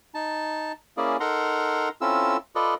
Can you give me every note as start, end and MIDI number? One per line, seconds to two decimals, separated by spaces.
0.14 0.72 63
0.14 0.72 81
0.97 1.17 58
0.97 1.17 61
0.97 1.17 64
0.97 1.17 68
0.97 1.17 74
1.20 1.89 63
1.20 1.89 69
1.20 1.89 70
1.20 1.89 78
1.20 1.89 82
1.20 1.89 84
2.01 2.37 60
2.01 2.37 61
2.01 2.37 64
2.01 2.37 65
2.01 2.37 69
2.01 2.37 88
2.55 2.74 65
2.55 2.74 69
2.55 2.74 71
2.55 2.74 74
2.55 2.74 75